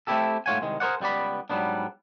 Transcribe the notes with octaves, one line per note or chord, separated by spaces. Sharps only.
A3 C4 D4 E4 G4 A4
G#2 A3 F4 C#5 F#5 G#5
C2 D#3 G#3
G#4 A#4 C5 D5 F#5
C#2 G3 B3 D5 B5
G#2 F#3 G3 A3 B3 D4